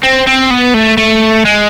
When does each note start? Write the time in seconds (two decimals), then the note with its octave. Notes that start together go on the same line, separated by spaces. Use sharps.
0.03 C4
0.27 C4
0.50 B3
0.74 A3
0.97 A3
1.45 G#3